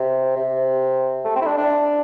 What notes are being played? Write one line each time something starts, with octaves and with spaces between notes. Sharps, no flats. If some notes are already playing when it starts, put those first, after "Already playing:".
Already playing: C3
C3
A3
C4
E4
D4
D4